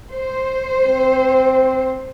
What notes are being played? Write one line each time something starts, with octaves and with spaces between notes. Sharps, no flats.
C5
C4